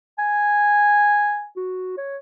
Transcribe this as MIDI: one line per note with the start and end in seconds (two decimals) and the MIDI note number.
0.19 1.47 80
1.56 1.96 66
1.98 2.18 73